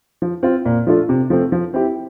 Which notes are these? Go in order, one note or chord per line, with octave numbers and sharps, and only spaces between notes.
F3
C4 F4
A#2
F3 A3 D4 F4
C3
F3 A3 C4
F3
C4 E4 G4